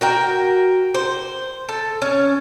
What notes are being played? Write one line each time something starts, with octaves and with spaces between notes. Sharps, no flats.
F#4 A#4 G5
C5
A4
C#4